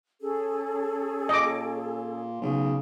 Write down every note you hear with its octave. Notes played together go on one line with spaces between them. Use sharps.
C#4 G#4 A4
A#2 D#5 D6
B1 C#3